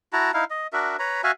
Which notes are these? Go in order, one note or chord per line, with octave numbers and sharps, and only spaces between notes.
E4 F#4 A5 A#5
D#4 E4 F5
D#5
D4 F#4 A#4 E5
B4 C#5 A#5 B5
F#4 E5 F5 G#5